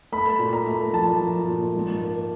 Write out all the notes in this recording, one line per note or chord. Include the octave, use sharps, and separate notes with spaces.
A3 B5
A#2
A#5
A3
F3 A5
F3
A#2
G#2
A#3